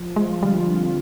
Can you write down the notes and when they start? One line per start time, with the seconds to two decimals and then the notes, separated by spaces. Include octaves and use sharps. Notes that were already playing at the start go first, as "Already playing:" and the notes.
Already playing: F3
0.16 G#3 F4
0.43 D3 G3
0.69 C4